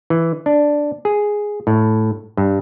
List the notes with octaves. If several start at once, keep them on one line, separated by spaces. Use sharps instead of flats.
E3
D4
G#4
A2
G2